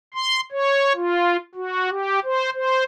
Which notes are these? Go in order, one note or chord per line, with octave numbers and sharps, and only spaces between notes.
C6
C#5
F4
F#4
G4
C5
C5